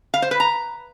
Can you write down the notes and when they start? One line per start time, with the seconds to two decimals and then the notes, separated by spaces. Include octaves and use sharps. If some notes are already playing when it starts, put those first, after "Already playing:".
0.14 F5
0.22 C5
0.31 B4
0.40 A#5